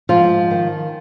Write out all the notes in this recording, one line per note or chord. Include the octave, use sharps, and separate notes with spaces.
G#2 F3 F4
D#3